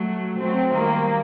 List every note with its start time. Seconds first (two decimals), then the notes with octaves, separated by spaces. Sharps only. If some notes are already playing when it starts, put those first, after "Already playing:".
Already playing: F#3 A3
0.39 F#3 A3 C4
0.73 D#3 G3 A#3